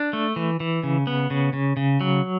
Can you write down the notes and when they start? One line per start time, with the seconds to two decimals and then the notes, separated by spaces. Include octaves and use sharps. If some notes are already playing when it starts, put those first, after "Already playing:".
Already playing: D4
0.13 A3
0.36 E3
0.60 E3
0.83 C#3
1.07 B3
1.30 C#3
1.53 C#3
1.77 C#3
2.01 F#3